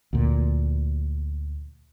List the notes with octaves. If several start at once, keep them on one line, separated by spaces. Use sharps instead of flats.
D2 A#2